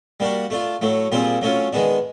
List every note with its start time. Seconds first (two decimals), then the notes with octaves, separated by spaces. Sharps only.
0.20 G3 A#3 D4 F#4
0.50 A3 D4 F4
0.81 A2 F#3 A3
1.12 A#2 G3 C4 F4 G#4
1.42 F#3 A3 C#4 F4
1.73 D#3 G#3 B3 D4